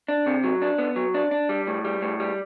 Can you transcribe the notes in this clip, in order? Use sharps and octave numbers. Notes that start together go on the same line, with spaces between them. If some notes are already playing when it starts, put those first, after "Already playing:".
D4
C3
F#3
D4
B3
F#3
D4
D4
G3
A2
G3
A2
G3